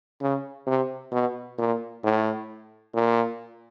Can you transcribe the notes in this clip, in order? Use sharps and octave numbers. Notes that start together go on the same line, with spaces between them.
C#3
C3
B2
A#2
A2
A#2